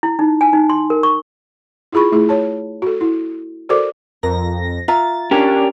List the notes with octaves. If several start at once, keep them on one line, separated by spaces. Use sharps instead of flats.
E4
D#4
G#5
D#4
C6
A#4
C#6
E4 F4 G#4 B5 C#6
A3 E4 G#4
C#5 A5
F#4 A4
E4
F#4 A4 A#4 C5 D5 D6
F2 A#4 A#6
F4 E5 A#5 A6
C#4 D4 G4 A#4